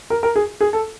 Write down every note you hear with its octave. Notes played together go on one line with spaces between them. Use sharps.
A#4
A#4
G#4
G#4
A4